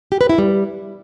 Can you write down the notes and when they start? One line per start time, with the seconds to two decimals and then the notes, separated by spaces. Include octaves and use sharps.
0.12 G4
0.21 B4
0.29 E4
0.38 G3